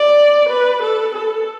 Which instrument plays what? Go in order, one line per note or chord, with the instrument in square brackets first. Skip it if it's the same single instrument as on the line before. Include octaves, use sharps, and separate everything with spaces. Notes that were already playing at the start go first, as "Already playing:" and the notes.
Already playing: [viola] D5
B4
A4
A4